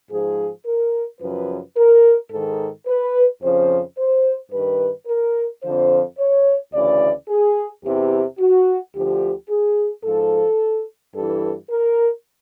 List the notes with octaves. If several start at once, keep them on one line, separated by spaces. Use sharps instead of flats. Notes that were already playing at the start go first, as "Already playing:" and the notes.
G#2 F3 G#4
A#4
F#2 C#3 F3 B4
A#4
G#2 D#3 A4
B4
F2 C#3 F3 C5
C5
G2 D#3 B4
A#4
F2 D3 F3 C5
C#5
D2 C#3 E3 D5
G#4
E2 C3 E3 G4
F#4
D2 D3 F3 G4
G#4
G#2 F3 A4
G2 E3 A4
A#4